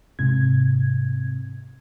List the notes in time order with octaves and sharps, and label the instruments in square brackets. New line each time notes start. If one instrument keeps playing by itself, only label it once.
[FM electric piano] G#2 C3 G#6